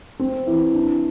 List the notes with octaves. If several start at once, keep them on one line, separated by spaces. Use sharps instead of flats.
C4
E3
D4